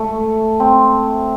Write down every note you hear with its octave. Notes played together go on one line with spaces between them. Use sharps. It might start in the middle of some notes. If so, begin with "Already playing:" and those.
Already playing: A3
C4